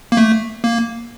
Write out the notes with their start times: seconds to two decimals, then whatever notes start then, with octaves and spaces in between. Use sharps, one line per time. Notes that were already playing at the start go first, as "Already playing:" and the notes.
0.12 A#3
0.17 A3
0.64 A#3